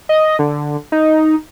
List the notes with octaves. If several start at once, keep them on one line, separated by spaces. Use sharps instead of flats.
D#5
D3
D#4